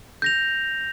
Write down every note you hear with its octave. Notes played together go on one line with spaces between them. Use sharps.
G6 A#6 F7